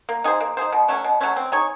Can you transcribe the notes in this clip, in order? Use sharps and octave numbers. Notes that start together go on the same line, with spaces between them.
A#3
D#4 G#4 C5
A#3
D#4 G#4 C5
B2
F#3 A3 C#4
B2
F#3 A3 C#4
C4
D#4 G#4 C#5